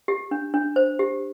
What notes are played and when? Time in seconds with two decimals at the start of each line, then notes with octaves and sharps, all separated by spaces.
0.08 G4
0.31 D4
0.54 D4
0.76 C5
0.99 G4